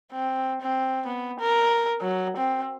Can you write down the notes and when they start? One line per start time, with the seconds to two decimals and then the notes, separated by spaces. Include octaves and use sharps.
0.12 C4
0.62 C4
1.06 B3
1.40 A#4
2.02 F#3
2.37 C4